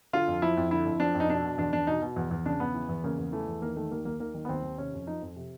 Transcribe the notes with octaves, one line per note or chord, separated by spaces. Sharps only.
D3 F4
F2
F3 E4
F2
D3 E4
F2
F3 D4
F2
D#4
B2 D4
B2
E2 D4
E2 D4
B2 D#4
B2
E2
E2
C#3 D4
E2 B3
E3
E2
C#3 A#3
E2
E3 A3
E2
D#3 A#3
D#3 A3
D#2 A#3
D#2 A#3
D#3 A#3
D#3
B3
D#2 C4
D#2
C3 C#4
F2
F3 D#4
F2
C3